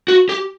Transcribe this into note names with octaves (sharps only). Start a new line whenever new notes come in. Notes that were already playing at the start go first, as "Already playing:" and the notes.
F#4
G4